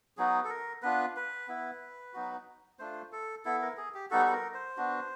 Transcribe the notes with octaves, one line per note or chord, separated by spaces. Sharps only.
F#3 B3 D#4 F#4 G#4
A4
A#4
B3 D4 F4 B4
B4
B3 E4
F#3 B3 D#4 F#4
A3 D4 F4 C5
A4
B3 E4 A4
A#4
G#4
G4
G3 B3 D#4 F#4 A4
A4
A#4
C5
B3 D4 F#4